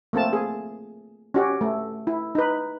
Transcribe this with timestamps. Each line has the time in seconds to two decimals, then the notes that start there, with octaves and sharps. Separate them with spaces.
0.13 A3 A#3 C4 A5
0.33 G#4
1.34 C#4 F#4 G4
1.61 A3
2.07 E4
2.35 D#4 B4